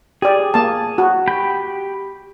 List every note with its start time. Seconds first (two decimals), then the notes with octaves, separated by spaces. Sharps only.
0.22 G4 G#4 D5
0.54 A#3 A5
0.98 F#4
1.28 G4 G5 B5